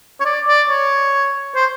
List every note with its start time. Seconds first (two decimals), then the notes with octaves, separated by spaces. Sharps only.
0.20 C#5
0.25 D5
0.47 D5
0.69 C#5
1.55 C5